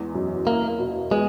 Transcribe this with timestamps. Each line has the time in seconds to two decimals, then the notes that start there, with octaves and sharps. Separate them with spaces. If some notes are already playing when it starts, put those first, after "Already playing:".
Already playing: E2 G#3
0.15 F#2
0.47 A#3 E4
0.79 B2
1.11 G#3 B3